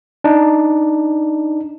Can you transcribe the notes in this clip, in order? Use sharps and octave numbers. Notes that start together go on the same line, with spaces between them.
D4 D#4